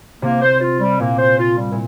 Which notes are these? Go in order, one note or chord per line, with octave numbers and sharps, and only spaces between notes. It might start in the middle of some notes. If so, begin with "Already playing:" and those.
C3 A#3
C5
F4
G3
A#2 A#3
C5
F4
G3
A#2